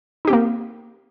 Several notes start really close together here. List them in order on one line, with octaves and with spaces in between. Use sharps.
D#4 G4 C4 A#3